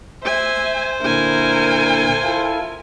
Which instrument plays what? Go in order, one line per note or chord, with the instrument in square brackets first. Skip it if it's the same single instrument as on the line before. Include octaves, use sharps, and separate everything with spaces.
[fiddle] C5 [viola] E5 G#5
[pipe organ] A#2 D3 E4 [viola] A#4 G#5
[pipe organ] E4 F4 A4